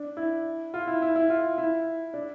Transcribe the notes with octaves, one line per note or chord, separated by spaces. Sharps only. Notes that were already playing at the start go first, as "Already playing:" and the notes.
Already playing: D4
E4
F4
E4
E4
E4
F4
E4
D4